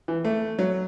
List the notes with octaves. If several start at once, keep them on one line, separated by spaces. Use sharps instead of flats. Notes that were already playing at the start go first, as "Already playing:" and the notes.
E3
A3
F#3